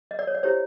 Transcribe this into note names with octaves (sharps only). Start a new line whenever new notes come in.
D#5
D5
C#5
D5
E4 G4 C5 C#5